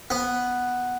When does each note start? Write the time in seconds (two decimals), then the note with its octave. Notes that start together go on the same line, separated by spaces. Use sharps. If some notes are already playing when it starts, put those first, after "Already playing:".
0.10 B3